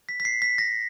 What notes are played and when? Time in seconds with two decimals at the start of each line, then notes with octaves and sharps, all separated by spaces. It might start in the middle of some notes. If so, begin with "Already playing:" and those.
0.09 B6
0.20 B6
0.25 C7
0.42 B6
0.58 A#6